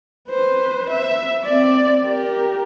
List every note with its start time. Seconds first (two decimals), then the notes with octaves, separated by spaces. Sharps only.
0.29 B4 C5
0.91 E5
1.44 C4 D5
2.07 G4 A#4